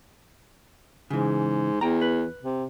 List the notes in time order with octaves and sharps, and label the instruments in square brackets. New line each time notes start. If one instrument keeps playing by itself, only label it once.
[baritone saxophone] G#2 [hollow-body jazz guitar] C#3 E3
[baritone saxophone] E2 [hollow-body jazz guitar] G5 A#5
[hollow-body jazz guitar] B4
[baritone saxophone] C3